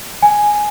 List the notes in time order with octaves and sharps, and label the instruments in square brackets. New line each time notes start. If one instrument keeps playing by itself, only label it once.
[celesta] G#5